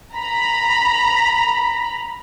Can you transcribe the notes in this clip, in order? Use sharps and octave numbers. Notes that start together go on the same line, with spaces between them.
A#5 B5